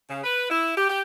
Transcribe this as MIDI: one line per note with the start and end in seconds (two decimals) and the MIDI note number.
0.10 0.22 49
0.24 0.48 71
0.50 0.71 64
0.76 0.87 67
0.89 1.02 67